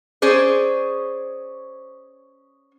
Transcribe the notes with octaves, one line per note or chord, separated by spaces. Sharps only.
C#4 G#4 C5 D5